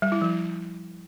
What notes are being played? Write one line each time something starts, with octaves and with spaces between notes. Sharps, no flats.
G3
E4
F3